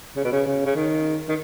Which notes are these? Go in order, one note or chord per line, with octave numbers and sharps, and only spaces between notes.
C#3
B2
C#3
C#3
C#3
D#3
D#3